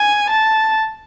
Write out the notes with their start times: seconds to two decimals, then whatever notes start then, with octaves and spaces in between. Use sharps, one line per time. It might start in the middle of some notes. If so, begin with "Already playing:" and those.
Already playing: G#5
0.30 A5